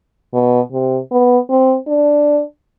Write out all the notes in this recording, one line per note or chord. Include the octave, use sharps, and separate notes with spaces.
B2
C3
B3
C4
D4